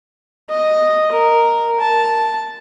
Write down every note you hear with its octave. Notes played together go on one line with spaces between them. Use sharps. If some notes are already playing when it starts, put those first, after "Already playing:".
D#5
A#4
A5